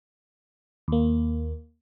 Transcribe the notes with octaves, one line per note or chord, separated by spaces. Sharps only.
D#2 A#3